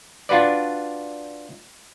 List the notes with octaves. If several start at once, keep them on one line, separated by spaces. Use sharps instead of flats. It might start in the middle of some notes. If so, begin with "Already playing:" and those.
D4 F4 F#4 B4 D5